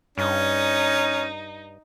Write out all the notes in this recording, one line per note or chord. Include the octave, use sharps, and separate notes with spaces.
G2 C#4 D#4